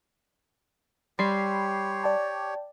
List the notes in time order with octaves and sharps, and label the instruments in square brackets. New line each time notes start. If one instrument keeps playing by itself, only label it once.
[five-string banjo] G3 [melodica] G4 C#5 [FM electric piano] B5 C6 C7
[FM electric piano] D5 G5 A5